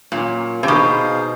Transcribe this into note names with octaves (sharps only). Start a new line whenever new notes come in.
A#2 F#3 A#3 C#4
C3
B2 D#4 G#4 C5 F5